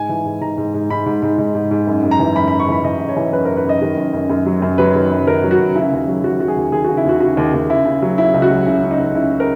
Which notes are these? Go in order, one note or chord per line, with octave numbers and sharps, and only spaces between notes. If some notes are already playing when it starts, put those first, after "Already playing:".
Already playing: G#2 G#5
E3
G#2
G#2 A#5
G#2
G#2
G#2 B5
G#2
G#2
G#2
G#2
G#2
F#2
F#2
A#5
E3
F#2 B5
F#2 B5
C#6
E3 B5
E3 D#5
F#2
C#5
E3
F#2 B4
F#2 A#4
B4
F#2 D#5
D#3
F#2
F#2
F#2
F#3
F#2
F#3 B4
D#3
F#2
D#3 A#4
F#3
F#4
F#2
C#3 E4
D#2
F#3
F#3 F#4
F#3 F#4
G#4
D#2
D#2 G#4
C#3 F#4
E4
D#2 F#4
C#3 F#4
D#2
D#2
C#3 E4
C#3
F#3
C#3 E4
C#2
F#4
F#3
C#3 E4
C#3
D#4
C#2
C#3 E4
A#4